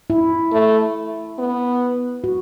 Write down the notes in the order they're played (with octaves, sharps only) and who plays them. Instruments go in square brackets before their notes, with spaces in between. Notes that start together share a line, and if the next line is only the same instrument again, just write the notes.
[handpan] E4
[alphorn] A3
B3
[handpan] F#4